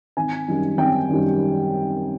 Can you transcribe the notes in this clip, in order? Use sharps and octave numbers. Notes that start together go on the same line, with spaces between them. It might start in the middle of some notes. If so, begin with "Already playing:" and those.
G#1 G#5
F#2 D#3 G3
G#1 G5
F#2 D#3 G3